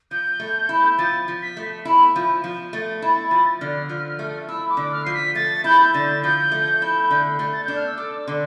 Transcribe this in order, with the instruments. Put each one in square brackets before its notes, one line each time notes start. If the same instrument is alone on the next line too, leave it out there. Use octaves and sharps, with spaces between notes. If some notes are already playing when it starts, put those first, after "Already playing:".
[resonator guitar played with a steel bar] F3 [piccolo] G6
[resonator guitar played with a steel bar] A3
E4
[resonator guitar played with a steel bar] F3 [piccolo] A6
[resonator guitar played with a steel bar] F3
[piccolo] B6
[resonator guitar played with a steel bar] A3
E4
F3
F3
[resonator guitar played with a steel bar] A3 [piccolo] A6
[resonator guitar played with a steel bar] E4
F3
[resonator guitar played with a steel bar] D3 [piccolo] F6
[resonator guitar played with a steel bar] F3
A3
[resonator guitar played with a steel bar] E4 [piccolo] E6
[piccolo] D6
[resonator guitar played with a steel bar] D3
[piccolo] F6
[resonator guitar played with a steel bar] F3 [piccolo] C7
[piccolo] B6
[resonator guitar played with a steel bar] A3 [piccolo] A6
[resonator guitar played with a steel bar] E4 [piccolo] G6
[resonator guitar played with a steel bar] D3 [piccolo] A6
[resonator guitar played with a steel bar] F3 [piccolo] G6
[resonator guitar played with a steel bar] A3
E4
D3
A3
[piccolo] A6
[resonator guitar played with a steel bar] D4 [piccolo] G6
[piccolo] F6
E6
[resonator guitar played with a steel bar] A4 [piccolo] D6
[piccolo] D6
[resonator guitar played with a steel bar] D3 [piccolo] C6